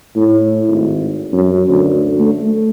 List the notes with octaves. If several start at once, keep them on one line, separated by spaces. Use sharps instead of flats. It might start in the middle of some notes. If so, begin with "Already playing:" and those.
A2
G#1
F#2
D2
A3